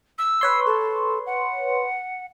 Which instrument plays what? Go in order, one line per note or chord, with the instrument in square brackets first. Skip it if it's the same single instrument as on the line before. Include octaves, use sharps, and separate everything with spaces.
[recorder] E6
[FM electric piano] B4 C#5 C6
[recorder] A4
F#5